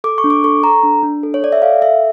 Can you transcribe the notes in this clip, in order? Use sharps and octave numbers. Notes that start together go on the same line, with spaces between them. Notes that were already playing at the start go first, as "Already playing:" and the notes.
A4 D6
C#6
D4
D6
A4 C#6
A4 A#5
D4
D4
A4
C#5
A4 D5
E5
A4 F5
A4 E5